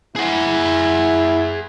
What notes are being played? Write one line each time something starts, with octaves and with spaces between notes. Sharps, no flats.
E4 G#4 F#5 G#5 B5